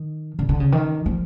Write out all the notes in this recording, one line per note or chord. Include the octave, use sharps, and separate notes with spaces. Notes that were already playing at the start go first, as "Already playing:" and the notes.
Already playing: D#3
D3
D3
C#3
D#3
F3